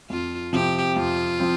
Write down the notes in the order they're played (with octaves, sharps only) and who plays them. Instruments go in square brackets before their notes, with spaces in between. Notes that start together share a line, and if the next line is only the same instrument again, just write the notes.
[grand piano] F2 [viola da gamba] F4
[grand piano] C3 F3 C4 [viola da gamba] G4
[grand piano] F2 [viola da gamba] F4
[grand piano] F3 C4